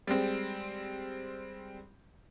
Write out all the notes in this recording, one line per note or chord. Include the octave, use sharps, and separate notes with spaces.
G3 G#3 C4